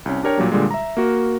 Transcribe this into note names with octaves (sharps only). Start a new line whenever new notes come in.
C2 C#4
D4 G4 A#4 C#5 G5 A#5
A#2 F#3 G3 A#3
A#2 D3 G3 G#3
E5 A#5
A#3 F#4 A#4